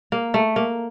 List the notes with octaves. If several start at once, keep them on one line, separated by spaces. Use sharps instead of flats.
A#3
A3
A#3